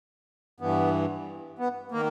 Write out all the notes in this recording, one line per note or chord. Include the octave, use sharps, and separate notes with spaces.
G2 E3 B3
B3
D#3 A#3